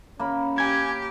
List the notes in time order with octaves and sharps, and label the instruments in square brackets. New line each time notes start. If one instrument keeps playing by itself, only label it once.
[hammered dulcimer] A#3 B5 [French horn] C#4
[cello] G4 [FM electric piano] G#5 G#6